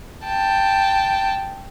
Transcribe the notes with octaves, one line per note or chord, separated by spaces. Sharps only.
G5 A5